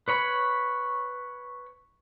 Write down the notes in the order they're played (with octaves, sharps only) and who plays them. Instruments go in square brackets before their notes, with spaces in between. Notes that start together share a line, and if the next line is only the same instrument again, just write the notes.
[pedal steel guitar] B4 C#5 B5